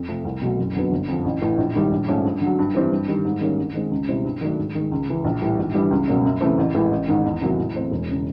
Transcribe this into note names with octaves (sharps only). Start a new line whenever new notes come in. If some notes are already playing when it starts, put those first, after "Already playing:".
Already playing: F2
C3 F3 A3
C2
B2 F#3 A3
F#1
F2 D3 F#3 B3
G1
F2 D3 F3
A1
A2 E3 A3
A#1
G#2 D#3 G3
A#1
G#2 F3 A3 C#4
G2
D3
F#3
G2
E3 G3 C4 E4
G2
D#3 G3
G#2
D#3 G3 A#3 C#4
G2
D#3 G#3 C4
C#2
B2 G3 C4 E4
G2
D#3 F#3 A3 D4
G#2
D#3 G#3
C#2
C#3 E3
A#1
A2 E3 G3
G#1
G2 E3 G3
C#2
B2 F#3 A#3 C#4
F#2
C#3 E3 A3 C4
A1
A2 E3 G#3
A1
G#2 D#3
E2
C3 D#3 F#3 A#3
A2
E3 A3 C4
E1
C#3